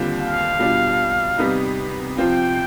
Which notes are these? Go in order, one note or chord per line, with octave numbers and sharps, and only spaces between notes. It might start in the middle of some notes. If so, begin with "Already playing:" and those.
Already playing: D#2 D3 G3 C4 F4
F5
B2 G3 D4 F4
C3 G3 B3 D#4
C3 F3 C4 F4 G5